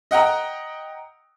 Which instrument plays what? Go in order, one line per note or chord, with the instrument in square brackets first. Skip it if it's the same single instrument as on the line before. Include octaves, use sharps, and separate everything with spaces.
[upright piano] D#5 F#5 G5 A#5